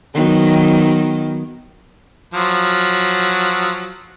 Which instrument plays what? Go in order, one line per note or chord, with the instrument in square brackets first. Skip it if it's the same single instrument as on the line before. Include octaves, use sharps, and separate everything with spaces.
[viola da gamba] D#3 F#3 B3
[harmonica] F3 F#3